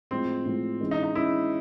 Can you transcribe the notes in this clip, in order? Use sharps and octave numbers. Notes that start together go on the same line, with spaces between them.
A2 F3 G#3 C4
A2 F3 G#3
E3 G#3 C#4
D#4
D#4
E3 G#3 C#4 E4